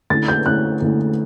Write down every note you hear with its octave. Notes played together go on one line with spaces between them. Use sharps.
D3 A3 C#4 E4 A6
G6
D3 A3 C#4 E4 F#6
D3 A3 C#4 E4